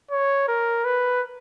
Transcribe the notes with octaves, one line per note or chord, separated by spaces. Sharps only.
C#5
A#4
B4